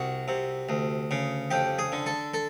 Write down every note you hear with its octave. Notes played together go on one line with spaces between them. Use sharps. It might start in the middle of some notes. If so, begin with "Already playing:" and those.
Already playing: C2 F#4
C3
D2
C#3
F2 G4
G#4
D3
A4
A4